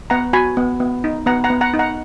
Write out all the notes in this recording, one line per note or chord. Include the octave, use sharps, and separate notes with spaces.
B3 F#5 A#5
F#4 G#5 B5
B3
B3
D#4
B3 F#5 A#5
F#5 A#5
B3
F#5 A#5
D#4
F#5 A#5